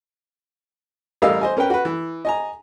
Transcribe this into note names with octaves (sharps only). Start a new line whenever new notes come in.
A1 G3 A#4 D#5 F5 E6
C5 D#5 G#5
C#4 A#4 B4 G5
F#4 B4
E3
D#5 G#5 A#5